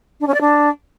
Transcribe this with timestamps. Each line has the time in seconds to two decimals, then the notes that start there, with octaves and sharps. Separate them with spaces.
0.20 D4
0.27 C#4
0.34 D5
0.41 D4